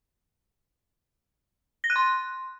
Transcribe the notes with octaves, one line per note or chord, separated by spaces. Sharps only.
A#6
F#6
C6